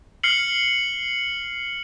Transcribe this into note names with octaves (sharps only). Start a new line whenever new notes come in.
F6 C7 C#7 F#7